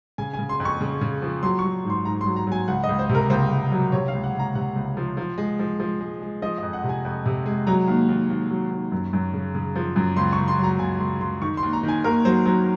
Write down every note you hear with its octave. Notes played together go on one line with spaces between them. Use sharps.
C#3 G#5
G#5
C#3
C6
F2
C#6
C#3
C#3
F3
F#3 C6
C#6
F#3
G#2
C6
G#2 A#5
F#3 C6
A#5
F#3 G#5
C#2 F#5
D#5
C#2
C5
C3
A#4
C#2 C5
C#2
F#3
C3 C#5
F5
C#2
F#5
C#2 A#5
C3 F#5
C#2
F3
F3
G#3
F3
F3
G#3
G#3
F3 D#5
F2 D#5
F#5
C3
G#5
F2
C3
G#3
F#3 A#5
D#2
D#2
D#2
F#3
D#2
F#2
F#2
C#3
C#3
F3
F#2
C#2 C6
C#6
C#2
C6
F#3 A#5
C#2 G#5
C#2 C6
C#2 C6
D#3 C#6
C6
D#2
A#5
D#3
G#5
D#2 A#4
F#3 C5
F#3 C5